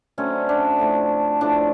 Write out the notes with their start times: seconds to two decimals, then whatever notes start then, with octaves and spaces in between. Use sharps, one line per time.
0.18 D3 F#3 A3 C4 C#4
0.49 D4
0.79 A2 F3 A3
1.41 A2 F3 A3 D4